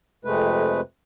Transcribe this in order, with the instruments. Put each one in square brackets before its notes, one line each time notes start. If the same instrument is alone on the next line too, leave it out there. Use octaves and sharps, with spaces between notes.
[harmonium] F2 C3 G#3 A3 B4